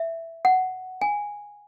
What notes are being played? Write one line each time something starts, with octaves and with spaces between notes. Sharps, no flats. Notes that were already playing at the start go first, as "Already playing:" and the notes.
Already playing: E5
F#5
G#5